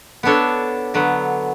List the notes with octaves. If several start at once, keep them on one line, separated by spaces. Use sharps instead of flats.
B3 D4 A4 C#5
D3 F#3 B3